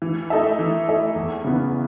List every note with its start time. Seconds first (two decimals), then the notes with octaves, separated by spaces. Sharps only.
0.02 E3
0.30 A3 D#4 A4 E5
0.59 E3
0.87 A3 D#4 A4 E5
1.16 E2
1.44 C#3 E3 B3